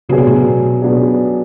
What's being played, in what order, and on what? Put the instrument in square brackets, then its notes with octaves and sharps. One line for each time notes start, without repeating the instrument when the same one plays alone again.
[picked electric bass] C#3 [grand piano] F#3 B3 D4 G#4
[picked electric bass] B2
A2
B2
[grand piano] F#3 B3 D4 G#4